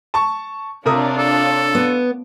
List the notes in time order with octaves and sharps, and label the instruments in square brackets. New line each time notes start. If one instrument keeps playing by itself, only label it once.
[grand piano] A5 C#6
[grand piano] C3 A#4 D#6 [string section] D4 F4 C#5
[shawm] A4
[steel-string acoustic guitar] B3